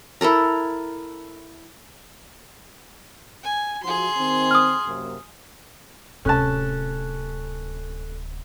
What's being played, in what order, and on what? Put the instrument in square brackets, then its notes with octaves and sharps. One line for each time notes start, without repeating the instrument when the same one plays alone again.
[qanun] E4 A4 A#4 A#5
[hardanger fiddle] G#5
[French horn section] F3 D#4 F#4 [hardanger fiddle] G#4 C6
[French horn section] D#3 C4
[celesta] D#6 F6
[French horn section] F#2 C3 A#3
[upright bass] D1 C3 [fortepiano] C#4 A5 [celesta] A4 F#6